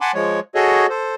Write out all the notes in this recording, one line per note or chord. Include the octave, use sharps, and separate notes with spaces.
F#5 G#5 A5 B5 C6 D6
F3 G#3 C#5
F#4 G#4 A4 C#5 D#5
A4 C5